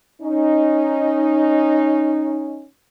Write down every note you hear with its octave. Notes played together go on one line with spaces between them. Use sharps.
C#4 D#4